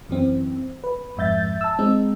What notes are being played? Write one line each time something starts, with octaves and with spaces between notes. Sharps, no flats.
F#2 E3 C4
B4
F2 G#2 E5 G6 A6
A5 E6
G#3 C4 D#4